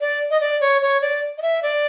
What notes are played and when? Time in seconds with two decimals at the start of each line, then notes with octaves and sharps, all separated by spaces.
0.01 D5
0.30 D#5
0.41 D5
0.61 C#5
0.82 C#5
1.01 D5
1.38 D#5
1.42 E5
1.63 D5